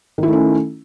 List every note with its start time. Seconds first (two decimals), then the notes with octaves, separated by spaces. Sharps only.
0.18 D#3
0.23 E4
0.28 A3
0.33 C#4